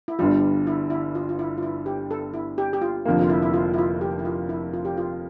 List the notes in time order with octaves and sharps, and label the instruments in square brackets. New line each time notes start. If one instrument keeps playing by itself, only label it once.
[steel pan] E4
[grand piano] G1 G2 D3 G3 [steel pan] F4
[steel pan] E4
E4
F4
F4
E4
F4
E4
G4
A4
E4
G4
G4
F4
[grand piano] F1 F2 D3 F3 A#3
[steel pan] F4
E4
E4
F4
E4
F4
G4
E4
F4
E4
F4
G4
F4